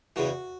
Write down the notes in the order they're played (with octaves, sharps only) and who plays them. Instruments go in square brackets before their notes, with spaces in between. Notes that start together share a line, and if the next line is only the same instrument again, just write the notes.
[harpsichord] E2 C#3 E3 F#4